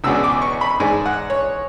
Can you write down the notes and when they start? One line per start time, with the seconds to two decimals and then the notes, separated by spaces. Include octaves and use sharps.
0.04 C#2 B2 G#3 B3 D4 E6
0.24 D6
0.42 C#6
0.61 B5
0.80 G#2 G#3 D4 G#5
1.06 F#5
1.30 C#5